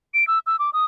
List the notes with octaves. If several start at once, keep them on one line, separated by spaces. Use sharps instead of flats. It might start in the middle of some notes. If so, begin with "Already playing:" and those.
D7
E6
E6
D6
D#6